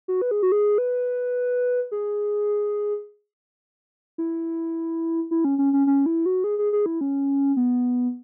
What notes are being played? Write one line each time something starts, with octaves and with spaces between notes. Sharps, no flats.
F#4
B4
G#4
F#4
G#4
B4
G#4
E4
E4
C#4
C#4
C#4
C#4
E4
F#4
G#4
G#4
G#4
E4
C#4
B3